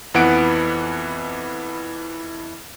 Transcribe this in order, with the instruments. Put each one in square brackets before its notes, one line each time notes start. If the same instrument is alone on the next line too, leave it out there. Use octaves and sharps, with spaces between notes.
[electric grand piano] F2 E3 B3 F#5 D7